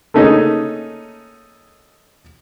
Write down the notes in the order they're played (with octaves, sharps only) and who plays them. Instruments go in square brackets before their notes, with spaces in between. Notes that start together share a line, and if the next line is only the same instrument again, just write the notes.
[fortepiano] A3 A#3 C#4 D#4 G#4 A4